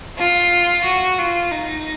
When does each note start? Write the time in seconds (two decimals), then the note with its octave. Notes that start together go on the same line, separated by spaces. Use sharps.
0.18 F4
0.84 F#4
1.18 F4
1.51 D#4